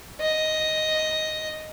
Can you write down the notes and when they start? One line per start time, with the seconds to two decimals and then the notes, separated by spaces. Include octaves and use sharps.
0.21 D#5